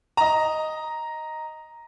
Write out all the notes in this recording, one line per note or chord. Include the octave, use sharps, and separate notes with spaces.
D#5 A#5